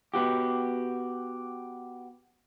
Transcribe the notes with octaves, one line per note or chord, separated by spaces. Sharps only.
B3 F#4 G4